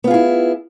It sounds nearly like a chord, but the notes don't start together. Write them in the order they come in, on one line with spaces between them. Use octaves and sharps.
B3 F4 G#4 E4